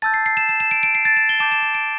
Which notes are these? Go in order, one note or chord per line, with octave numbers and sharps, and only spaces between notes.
A5 E6 G6 A6
C7
C7
E7
E7
E7
D7
D7
C7
A6
E7
G7
A5 D6 G6 E7
E7
E7
D7